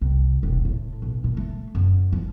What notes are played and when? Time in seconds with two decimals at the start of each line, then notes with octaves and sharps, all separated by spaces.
0.01 C2
0.43 E1
0.65 A2
1.02 B1
1.24 A#2
1.37 A3
1.75 F#2
2.13 F3